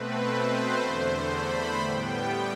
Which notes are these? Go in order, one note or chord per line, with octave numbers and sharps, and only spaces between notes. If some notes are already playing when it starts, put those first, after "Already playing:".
Already playing: B2 A3 C4 B4
C5
E2 D3 A3
B5
A2 G3 B3 G5